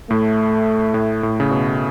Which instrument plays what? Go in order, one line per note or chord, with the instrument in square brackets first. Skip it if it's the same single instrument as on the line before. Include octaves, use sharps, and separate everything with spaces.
[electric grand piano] A2 [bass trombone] A3
[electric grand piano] A2
A2
C#3
B2